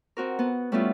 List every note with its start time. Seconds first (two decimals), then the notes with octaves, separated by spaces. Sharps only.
0.17 C4 F#4 A#4
0.39 B3
0.72 G3 A3 B3 C#4 E4 F4